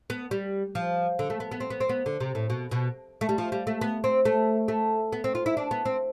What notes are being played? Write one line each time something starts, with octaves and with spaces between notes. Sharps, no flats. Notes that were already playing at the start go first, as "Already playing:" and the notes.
B3
G3
F3
D3
A3
B3
B3
C4
B3
C4
B3
D3
C3
A2
B2
B2
A3
G3
F3
G3
A3
B3
C4
A3
A3
B3
C4
F4
E4
D4
B3
C4